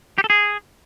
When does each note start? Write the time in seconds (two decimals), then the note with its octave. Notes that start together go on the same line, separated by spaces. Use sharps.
0.18 G4
0.24 A4
0.30 G#4